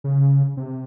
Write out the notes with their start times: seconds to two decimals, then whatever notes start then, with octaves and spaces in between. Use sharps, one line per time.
0.04 C#3
0.57 C3